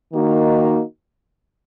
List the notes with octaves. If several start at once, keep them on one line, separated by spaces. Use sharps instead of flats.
D#3 A#3 D#4 F#4 A#4